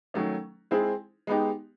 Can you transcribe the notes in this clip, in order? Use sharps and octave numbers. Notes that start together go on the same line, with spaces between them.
D#3 F#3 A3 C#4
G#3 C4 E4 G#4
G#3 B3 D#4 G4